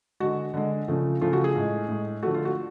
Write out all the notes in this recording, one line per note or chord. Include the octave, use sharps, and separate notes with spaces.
D3 G#3 F#4
D3 G#3
C#3 F3 A3
C#3 F3 A3 F4
F#4
G#4
A2 G#3
A2 G#3
D3 F3 A3 F#4
F4
F#4